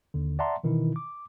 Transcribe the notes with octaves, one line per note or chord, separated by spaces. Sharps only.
D#2 D3
D5 E5 F#5 A5 A#5 C6
B2 D#3 E3 D#4 E4
D6